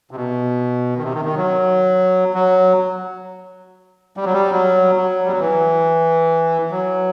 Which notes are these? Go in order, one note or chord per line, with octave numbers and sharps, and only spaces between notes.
C3
B2
D#3
C3
D#3
D#3
F#3
F#3
G3
F#3
G3
F#3
F#3
G3
F#3
E3
F#3